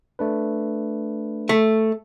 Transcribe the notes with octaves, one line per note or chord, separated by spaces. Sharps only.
A3 D4 B4
A3